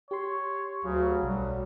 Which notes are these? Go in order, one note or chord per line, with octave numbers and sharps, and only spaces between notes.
G4 C#5 C6
D2 C#3 F#3
B1 D3 G3